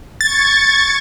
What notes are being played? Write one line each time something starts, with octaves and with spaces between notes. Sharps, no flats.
C#6 G#6 A6